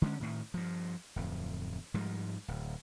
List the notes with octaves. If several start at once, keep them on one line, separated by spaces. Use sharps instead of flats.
D3 G#3 A#3 C#4
A2 D#3
G2 F3
D1 F2
G#2 F3 G3 G#3
D1